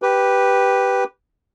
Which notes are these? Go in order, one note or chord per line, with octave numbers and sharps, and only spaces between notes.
G4 B4